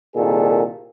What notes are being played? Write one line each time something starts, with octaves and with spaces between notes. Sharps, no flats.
C2 A#2 D#3 G#4 A4